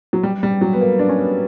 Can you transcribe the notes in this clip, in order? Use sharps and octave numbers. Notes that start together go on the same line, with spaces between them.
F#3
G3
G3
F#3
B3
A#3
D4
C#4
B3